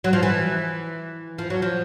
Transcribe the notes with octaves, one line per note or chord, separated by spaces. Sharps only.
F#3
F3
E3
F3
F#3
F3